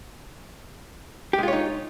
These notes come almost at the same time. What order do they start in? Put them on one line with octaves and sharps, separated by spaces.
G4 G#3 F4 C#5 D#4